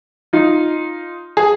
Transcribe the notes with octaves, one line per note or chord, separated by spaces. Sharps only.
D#4 F4
G#4